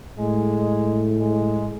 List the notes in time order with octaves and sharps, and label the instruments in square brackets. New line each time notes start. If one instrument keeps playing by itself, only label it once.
[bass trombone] A2 [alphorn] G#3
[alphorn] G#3